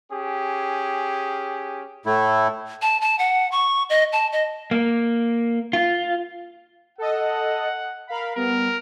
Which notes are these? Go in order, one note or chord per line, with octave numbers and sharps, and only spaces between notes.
C#4 G4 G#4
A2 A3 E4
A5
A5
F#5
C#6
D#5
A5
D#5
A#3
F4
A4 D#5 F#5
A#4 F5 B5
G3 B3 A#4